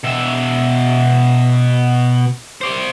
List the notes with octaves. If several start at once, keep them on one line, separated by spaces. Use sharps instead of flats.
B2 E5
C5 D5